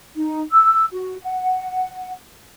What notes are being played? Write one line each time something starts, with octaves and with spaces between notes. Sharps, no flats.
D#4
E6
F#4
F#5